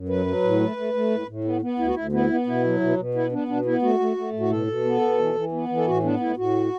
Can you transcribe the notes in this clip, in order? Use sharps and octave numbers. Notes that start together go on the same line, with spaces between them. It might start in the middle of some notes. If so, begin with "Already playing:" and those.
Already playing: F#2
F#3 B4
F#3
A2
A3
A3
A3
A2
A2
B3
B3
D2 E4
F#4
D2 E4
B3 E4
B3
B2 E4
F#3
B2
B2
B3 E4
B3 D4
B2 D4
B3 E4
A3 F#4
A3
A3
A2
F#4
B2 A4
B2
B3
B2
E3
E3
B3
E3
A4
A2 F#4
B3 D4
A2 E4
A2 F#4